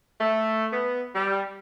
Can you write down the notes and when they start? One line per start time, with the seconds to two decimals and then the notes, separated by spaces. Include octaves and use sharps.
0.21 A3
0.73 B3
1.15 G3